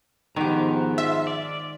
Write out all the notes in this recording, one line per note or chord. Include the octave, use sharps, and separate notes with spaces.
G#2 D#3 F3 B3 G4 A#5
F4 E5
D5